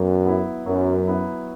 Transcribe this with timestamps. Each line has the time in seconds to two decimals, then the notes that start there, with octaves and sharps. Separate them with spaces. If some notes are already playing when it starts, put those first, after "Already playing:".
Already playing: F#2 F#3 B3
0.25 B3 E4
0.66 F#2 F#3
1.07 B3 E4